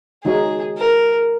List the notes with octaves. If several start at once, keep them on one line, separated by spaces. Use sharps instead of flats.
D#3 G#3 D#4 F#4 G#4 C#5
A#4